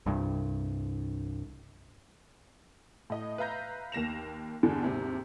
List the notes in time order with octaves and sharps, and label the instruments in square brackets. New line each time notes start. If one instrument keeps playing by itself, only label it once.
[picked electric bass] C2 G2
[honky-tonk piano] A2 D#5
B4 E5 F5 A#5 G6 A#6
D#2 A#3 A#6 E7 F7
E2 G2 D3
D#2 G#2 C3